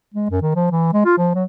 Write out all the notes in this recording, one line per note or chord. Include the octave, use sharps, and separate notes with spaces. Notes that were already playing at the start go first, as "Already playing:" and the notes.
G#3
F#2
D#3
F3
E3
G#3
F4
F3
F#3